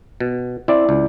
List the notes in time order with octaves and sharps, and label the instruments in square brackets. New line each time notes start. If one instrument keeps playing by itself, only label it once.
[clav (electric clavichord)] B2
[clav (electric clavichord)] C4 [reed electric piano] E4 D5
[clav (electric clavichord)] C#2